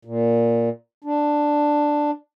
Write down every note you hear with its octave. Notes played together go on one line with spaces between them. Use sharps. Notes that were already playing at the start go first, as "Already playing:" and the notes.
A#2
D4